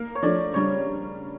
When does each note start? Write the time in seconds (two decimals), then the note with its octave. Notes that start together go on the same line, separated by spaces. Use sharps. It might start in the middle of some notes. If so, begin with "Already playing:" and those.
Already playing: A#3 A#4
0.15 C#5
0.23 F3 A3 D4 D5
0.54 C#3 G3 D4 C#5